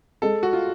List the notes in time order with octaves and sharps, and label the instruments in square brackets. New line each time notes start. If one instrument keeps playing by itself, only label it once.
[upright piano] G#3 [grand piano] A4
[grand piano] F#4
[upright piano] F4